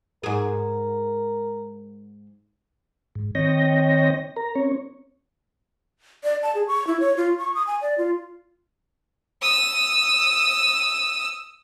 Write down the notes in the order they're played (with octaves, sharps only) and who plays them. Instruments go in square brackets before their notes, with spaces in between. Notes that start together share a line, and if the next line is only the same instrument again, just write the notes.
[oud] G#2 G#4 [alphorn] A#4
[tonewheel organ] G#2
D#3 C4 C#5 D#5 G5 A#6
A#4 A#5
C4 C#4 C#5
[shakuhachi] D5
A5
G#4
C#6
E4
C#5
F4
C#6
D#6
G#5
D5
F4
[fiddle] D#6 E6